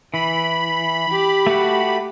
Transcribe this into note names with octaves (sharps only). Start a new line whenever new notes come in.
E3 B5
G4
A3 F#4